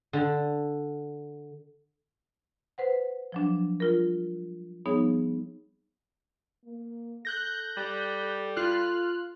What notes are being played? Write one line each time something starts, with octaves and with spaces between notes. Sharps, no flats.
D3
B4 C5 F#5
F3 F#3 D4
G3 F4 A#4
F3 G3 B3 D#4 G#4 C#5
A#3
A4 F#6 G6 A#6
G3
F4 F6 F#6